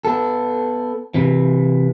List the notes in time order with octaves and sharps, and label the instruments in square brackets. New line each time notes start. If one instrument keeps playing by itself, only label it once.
[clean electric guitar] B3 A4
C3 E3